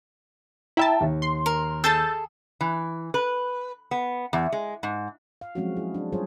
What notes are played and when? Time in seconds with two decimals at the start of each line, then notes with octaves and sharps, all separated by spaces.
0.77 E4 E5 G5 A5 A#5
1.01 D#2
1.22 C6
1.46 A#4
1.84 G#4 A4 A5 E6 G6 A6
2.61 E3
3.14 B4
3.91 B3
4.33 E2
4.53 G#3
4.83 G#2
5.41 F5
5.55 F3 F#3 G#3 C4 C#4 F#4
5.77 E4 G#4
5.94 D4
6.12 F#3 G3 F4 G#4 C5 C#5